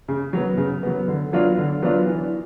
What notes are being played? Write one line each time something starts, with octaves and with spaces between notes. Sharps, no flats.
C#3
F#3 B3
C#3
F#3 B3
D3
F#3 B3 D4 F4
D3
F#3 B3 D4 F4
E3